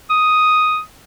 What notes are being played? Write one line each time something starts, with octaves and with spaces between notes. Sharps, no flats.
D#6